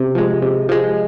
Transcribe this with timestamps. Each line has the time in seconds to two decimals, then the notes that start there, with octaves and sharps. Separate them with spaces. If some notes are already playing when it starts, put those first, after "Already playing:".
Already playing: C3
0.15 F3 G#3
0.42 C3
0.69 F3 G#3